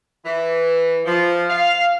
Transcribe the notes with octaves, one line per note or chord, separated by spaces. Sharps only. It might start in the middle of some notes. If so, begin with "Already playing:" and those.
E3
F3
F5